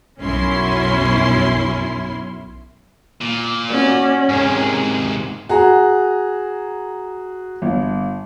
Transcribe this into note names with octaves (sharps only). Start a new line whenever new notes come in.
B1 F#2 C#4 E4 C6
A#2
C#4 F#4 D5
G#2 C3 G#4 A#4
F#4 G#4 A#5
G1